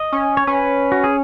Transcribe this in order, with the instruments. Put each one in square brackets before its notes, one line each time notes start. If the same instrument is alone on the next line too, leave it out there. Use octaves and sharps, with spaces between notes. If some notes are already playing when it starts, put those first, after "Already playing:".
Already playing: [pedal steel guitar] D#5
[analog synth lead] C#4
[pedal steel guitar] C#5
[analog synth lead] C#4 [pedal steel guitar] B4
[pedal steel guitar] F#4
G#4